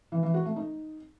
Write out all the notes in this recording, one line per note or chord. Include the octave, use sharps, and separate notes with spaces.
E3
E3
F#4
A3
D#4